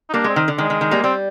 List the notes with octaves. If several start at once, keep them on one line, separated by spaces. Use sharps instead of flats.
D#4
G3 A#3 D4
G#3 C4
D#3
D3
D#3 G#3
D#3
D#3
G3 A#3
G3 C4